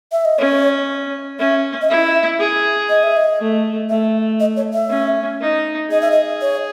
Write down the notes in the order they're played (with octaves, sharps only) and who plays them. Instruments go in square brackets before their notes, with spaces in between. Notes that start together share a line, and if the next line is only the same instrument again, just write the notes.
[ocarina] E5
D#5
[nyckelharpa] C#4 [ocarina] C#5
[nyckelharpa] C#4 [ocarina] E5
[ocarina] D#5
[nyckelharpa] E4 [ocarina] E5
[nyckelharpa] G#4
[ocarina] D#5
E5
D#5
[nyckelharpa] A3
[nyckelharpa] A3 [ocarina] E5
[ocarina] D#5
C#5
E5
[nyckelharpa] C#4
D#4
[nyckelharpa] G#4 [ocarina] D#5
[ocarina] E5
D#5
C#5